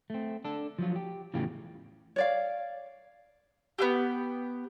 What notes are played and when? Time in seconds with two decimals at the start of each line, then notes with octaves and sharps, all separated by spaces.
0.10 A3 C4
0.45 D4 A4
0.79 F3 F#3 F4
0.96 G4
1.34 E2 A2 C#3 F4 G4
2.16 C#5 D5 F5
3.78 B3 F4 G4